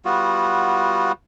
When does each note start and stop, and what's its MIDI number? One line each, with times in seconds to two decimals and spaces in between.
0.05 1.12 55
0.05 1.12 59
0.05 1.12 65
0.05 1.12 66